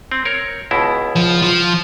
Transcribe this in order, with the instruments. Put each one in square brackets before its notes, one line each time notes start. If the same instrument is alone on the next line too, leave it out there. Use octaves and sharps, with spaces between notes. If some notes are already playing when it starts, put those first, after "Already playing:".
[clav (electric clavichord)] C4
A#4 C#5
C#2 B2 E4
[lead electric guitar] F3
F3